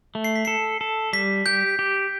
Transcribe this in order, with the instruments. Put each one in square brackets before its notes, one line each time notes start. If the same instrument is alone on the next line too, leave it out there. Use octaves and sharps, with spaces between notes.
[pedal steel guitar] A3
[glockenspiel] C7
B6
[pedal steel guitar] A4 [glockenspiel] C7
[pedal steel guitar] A4
[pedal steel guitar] G3 [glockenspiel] B6
[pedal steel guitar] G4 [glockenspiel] G6
[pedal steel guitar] G4